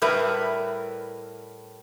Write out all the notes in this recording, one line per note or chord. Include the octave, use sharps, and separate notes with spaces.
A2 G3 A#4 B4 E5